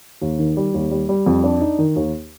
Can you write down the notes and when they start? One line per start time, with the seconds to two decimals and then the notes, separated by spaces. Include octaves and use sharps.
0.22 D#2
0.39 D#3
0.57 G3
0.74 D#2
0.91 G3
1.09 G3
1.26 F2
1.44 D4
1.61 D#4
1.79 D#3
1.96 D#2